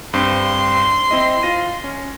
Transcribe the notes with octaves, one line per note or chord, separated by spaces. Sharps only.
G2 C4 C6
C4 E4 D#5
F4 A#6 D#7
C#4